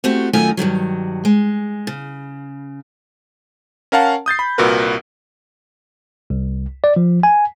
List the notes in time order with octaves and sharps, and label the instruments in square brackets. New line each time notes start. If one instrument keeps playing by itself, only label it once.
[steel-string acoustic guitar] A3 C4 F#4 G4
F#2 D#3 A3 D#4 F4 G#5
G2 A#2 D#3 F#3
G#3
C#3
[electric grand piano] C#4 A#4 F5 F#5 A5
D#6 G6 A6 C7
B5
C2 A#2 F#4 A#4 B4
[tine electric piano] C2
D5
F3
G#5